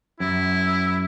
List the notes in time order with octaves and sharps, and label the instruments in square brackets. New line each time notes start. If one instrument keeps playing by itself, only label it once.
[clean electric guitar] F#2 [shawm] E4